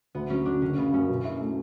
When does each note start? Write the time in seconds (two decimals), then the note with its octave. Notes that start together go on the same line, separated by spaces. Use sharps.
0.15 D2 B3
0.30 F#3 C#4
0.46 D3 D4
0.62 F#1 C#4
0.77 C#3 B3
0.93 F#2 C#4
1.09 B2
1.25 E4
1.41 A3